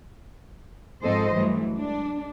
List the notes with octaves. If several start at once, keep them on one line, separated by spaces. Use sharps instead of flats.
G#2 F3 C4 A4 C5 D#5
G2 E3 F#3 A3
G#3 D4